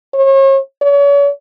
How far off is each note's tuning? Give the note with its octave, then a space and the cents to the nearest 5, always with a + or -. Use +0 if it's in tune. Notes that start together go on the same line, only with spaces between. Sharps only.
C#5 -40
C#5 +40